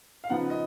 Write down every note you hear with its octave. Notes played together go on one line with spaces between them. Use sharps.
F5
C#3 F3 B3 D#4 F#5
D#5